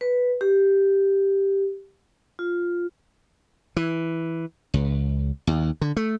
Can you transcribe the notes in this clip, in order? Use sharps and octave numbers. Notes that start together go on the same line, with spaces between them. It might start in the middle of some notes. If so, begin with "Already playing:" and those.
B4
G4
F4
E3
C#2
D#2
D3
A3